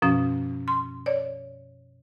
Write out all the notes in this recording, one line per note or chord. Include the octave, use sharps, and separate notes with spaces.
F#2 B2 F3 C#4 D#6
C6
C#5 D5